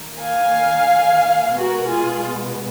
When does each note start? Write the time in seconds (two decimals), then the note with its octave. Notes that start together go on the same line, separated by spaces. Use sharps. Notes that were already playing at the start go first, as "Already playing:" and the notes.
Already playing: D#3 A#3
0.22 F5 G#5
1.58 B2 G#3 B3 F#4 A#4
1.89 F4 G#4